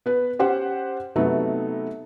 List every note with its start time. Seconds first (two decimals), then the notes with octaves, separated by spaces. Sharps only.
0.06 B3 B4
0.39 C#4 G4 C5 F#5
1.16 C3 F#3 A3 B3 D#4